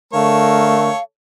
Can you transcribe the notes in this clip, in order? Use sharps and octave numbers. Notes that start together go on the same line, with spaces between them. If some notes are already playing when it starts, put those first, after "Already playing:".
D3 A3 A4 A#4 C#5 F5